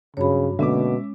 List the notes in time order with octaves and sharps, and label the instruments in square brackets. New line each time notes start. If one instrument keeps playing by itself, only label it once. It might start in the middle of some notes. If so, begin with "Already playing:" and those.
[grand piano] G2 F#3 [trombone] C#3 [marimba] C#5 B5
[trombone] B2 [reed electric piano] D3 A#3 [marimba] G#3 C#4 [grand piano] E5 D6